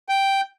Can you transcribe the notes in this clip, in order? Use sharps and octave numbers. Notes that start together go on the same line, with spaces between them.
G5